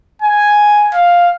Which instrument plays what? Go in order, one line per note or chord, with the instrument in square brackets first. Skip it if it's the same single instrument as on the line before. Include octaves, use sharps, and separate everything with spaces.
[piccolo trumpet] G#5
F5